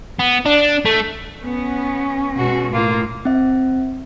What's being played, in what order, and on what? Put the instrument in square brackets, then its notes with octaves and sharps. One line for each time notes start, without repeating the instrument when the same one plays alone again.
[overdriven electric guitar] B3
D4
A3
[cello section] B3 [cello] C#4
[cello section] B2 G#3 F#4
[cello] A2 [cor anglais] A#3 [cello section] F4
[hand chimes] C4 E5